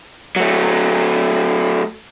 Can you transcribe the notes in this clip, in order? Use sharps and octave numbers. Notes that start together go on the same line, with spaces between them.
F#3 A3